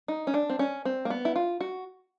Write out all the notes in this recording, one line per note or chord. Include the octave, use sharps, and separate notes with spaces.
D#4
C#4
D4
C4
C#4
C4
A#3
B3
E4
F4
F#4